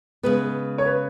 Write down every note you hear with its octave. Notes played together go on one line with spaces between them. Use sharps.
C#3 G#3 B3 B4
C#5
B4